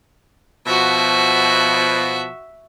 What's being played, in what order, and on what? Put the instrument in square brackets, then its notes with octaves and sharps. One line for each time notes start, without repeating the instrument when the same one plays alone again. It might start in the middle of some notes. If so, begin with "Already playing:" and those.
[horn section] B2 F3 [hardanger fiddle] F#4 E5